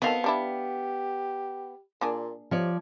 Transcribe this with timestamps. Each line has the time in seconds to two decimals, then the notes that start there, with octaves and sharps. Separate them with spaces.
0.02 D#3 F#3 B3 C4 A4 F5
0.24 G3 D4 E4 G4
2.01 A#2 A#3 D4 G#4
2.51 C3 F3 C#5 D5